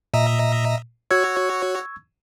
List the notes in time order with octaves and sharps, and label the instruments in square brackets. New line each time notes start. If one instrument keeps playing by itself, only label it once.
[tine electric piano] A#2 [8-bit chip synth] D#5 E5 A#5
[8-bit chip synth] F#4 C#5 [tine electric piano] C#6 E6 G#6